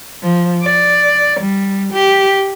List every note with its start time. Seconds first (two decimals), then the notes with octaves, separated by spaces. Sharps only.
0.23 F3
0.64 D5
1.41 G3
1.93 G4